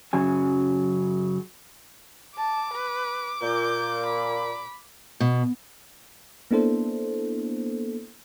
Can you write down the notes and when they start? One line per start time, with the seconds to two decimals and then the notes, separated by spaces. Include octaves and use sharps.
0.13 F#2 C#3 F#3 G#5
2.37 A5 D6
2.73 B4
3.42 A#2 G6
4.06 B5
5.20 B2
6.51 A#3 B3 D4 E4 A4 C5